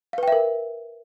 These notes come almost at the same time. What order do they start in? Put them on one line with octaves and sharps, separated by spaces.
F5 B4 G5 E5 A#4